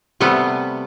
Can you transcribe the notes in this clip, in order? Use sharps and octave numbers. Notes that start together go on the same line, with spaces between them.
C3 G3 A3 B3